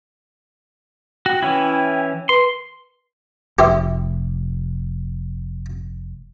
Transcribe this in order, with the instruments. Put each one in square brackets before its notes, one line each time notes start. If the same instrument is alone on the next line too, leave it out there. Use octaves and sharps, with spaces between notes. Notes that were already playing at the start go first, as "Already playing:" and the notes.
[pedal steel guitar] F#4 [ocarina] G5
[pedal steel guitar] E3 C#4 E4
[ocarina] B4 [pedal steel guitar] C6
[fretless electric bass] F1 [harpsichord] G4 C5 E5